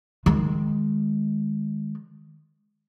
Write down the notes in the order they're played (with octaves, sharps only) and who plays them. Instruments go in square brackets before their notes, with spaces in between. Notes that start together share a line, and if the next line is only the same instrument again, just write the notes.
[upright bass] D#3 G#3